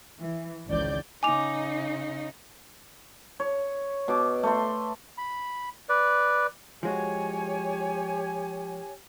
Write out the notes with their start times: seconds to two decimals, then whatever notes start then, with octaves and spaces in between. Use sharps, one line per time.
0.19 E3
0.67 G#1 C#2 E3 D5 G6
1.23 C#3 D#4 G#5 D6 F7
3.40 C#5
4.08 B2 D6
4.43 A3 C6
5.18 B5
5.89 B4 D5
6.83 F3 G#3 F#4 G4 C#5 G#5